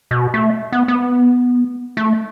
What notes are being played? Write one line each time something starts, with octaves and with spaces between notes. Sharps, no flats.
B2
A3
B3
B3
A3